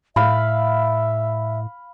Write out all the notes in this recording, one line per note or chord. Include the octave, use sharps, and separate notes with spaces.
A2 E5 F5 B5